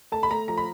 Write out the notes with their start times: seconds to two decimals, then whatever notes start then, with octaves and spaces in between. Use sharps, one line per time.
0.12 A3 A5
0.23 B5
0.31 A3 A#5
0.48 F3 A#5
0.57 B5